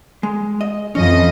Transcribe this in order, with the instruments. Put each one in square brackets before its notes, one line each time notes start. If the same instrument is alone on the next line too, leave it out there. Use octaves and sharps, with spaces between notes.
[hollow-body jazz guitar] G#3
D#5
[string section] F2 E3 D#5 [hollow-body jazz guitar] C#4